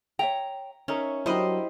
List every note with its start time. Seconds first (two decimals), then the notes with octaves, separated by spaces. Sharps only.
0.19 C#5 E5 G5 A#5
0.88 C#4 D#4 A#4 C#5 E5
1.26 F#3 G3 D4 E4 A#4 C5 D#5 B5